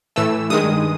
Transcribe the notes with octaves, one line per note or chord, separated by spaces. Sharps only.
A2 E3 A3 E6
G2 D#3 G#3 D#6